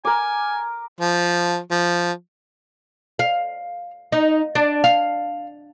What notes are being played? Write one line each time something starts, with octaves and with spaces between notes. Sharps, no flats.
A#4 G#5 D6
F3
F3
F5
D#4
D4
F5